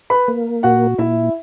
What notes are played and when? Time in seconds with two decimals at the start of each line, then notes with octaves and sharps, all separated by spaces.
0.10 B4 B5
0.28 A#3
0.63 A#2 F#4 F#5
0.98 A#2 E4 E5